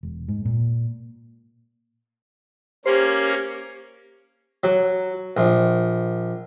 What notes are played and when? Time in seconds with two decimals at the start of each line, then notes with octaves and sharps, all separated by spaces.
0.03 E1
0.28 G#2
0.45 A#2
2.86 A#3 C#4 G4 C5
4.64 F#3
5.37 A#1